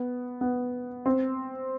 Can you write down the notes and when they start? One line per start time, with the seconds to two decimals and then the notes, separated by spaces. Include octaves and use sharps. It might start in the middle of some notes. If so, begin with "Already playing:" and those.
Already playing: B3
0.41 B3
1.06 C4